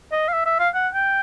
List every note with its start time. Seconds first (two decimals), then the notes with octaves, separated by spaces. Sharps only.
0.12 D#5
0.28 F5
0.33 E5
0.45 E5
0.59 F5
0.74 F#5
0.94 G5